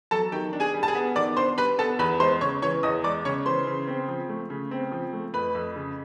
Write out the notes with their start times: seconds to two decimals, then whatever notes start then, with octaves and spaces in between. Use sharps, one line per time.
0.11 F#3 A4 A5
0.32 D#3 G4 G5
0.53 D4
0.60 G#4 G#5
0.74 G3
0.83 A5
0.88 G#4 G#5
0.95 B3
1.16 D#3 D5 D6
1.37 D4 C5 C6
1.58 G3 B4 B5
1.79 B3 A4 A5
1.99 E2 B4 B5
2.20 G#3 C5 C6
2.41 C#3 C#5 C#6
2.62 E3 C#5 C#6
2.83 E2 D#5 D#6
3.04 G#3 D5 D6
3.25 C#3 C#5 C#6
3.46 E3 C5 C6
3.67 C#3
3.88 C4
4.08 F3
4.29 A3
4.50 C#3
4.71 C4
4.92 F3
5.13 A3
5.34 F2 B4 B5
5.55 F2
5.76 C#3